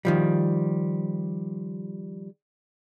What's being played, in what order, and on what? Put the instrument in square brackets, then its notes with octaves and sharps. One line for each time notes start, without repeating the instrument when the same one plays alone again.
[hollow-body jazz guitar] D#3 F3 G3